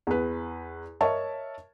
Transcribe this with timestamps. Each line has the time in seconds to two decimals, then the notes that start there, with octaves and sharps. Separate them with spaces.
0.07 E2 B4
1.01 A#4 C#5 D#5 E5 A5 C#6